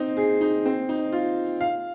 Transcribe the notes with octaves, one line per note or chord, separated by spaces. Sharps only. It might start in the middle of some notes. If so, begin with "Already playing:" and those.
Already playing: C4 D#4
G#4
D#4
C4
D#4
F4
F5